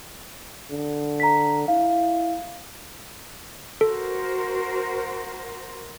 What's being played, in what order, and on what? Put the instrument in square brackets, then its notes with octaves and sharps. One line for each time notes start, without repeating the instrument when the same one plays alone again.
[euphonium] D3
[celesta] A#5 B6
[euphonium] E4 [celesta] F5
[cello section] F#4 A#4 C5 [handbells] A4